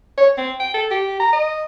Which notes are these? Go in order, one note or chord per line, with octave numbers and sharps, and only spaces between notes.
C#5
C4
G5
A4
G4
A#5
D#5